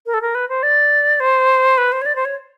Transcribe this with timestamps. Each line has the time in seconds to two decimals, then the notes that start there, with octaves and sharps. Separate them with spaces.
0.06 A#4
0.14 A4
0.22 A#4
0.35 B4
0.49 C5
0.63 D5
1.20 C5
1.78 B4
1.92 C5
2.02 C#5
2.06 D5
2.16 C5
2.25 C#5